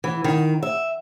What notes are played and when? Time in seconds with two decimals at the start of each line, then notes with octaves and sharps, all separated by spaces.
0.04 E3
0.24 D#3
0.63 E5